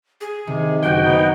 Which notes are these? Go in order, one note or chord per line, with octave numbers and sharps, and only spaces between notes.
G#4
C3 D#3
F#1 F#4 C5 G5
B3 D#4